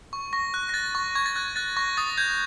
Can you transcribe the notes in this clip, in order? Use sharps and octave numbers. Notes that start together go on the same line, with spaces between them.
C#6
C#6 A#6
F#6
A#6
F#6 A6
C#6
C#6 G#6
A6
F#6 G#6
F#6 A6
C#6 A#6
D#6 A6
G6 G#6